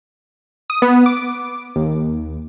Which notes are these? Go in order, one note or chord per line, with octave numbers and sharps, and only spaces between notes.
D#6
B3
D6
D#2